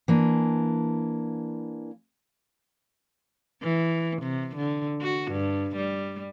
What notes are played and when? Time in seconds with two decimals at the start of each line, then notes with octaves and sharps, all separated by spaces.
0.08 E3 A#3 D4
3.63 E3
4.22 C3
4.56 D3
5.02 F#4
5.32 G2
5.76 G3